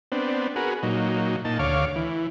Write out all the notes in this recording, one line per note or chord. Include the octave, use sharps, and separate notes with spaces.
B3 C4 D4
F#4 G#4 A#4 B4
A#2 F#3 D#4
A#2 D#4 A5
D2 C#5 F5 D6
E3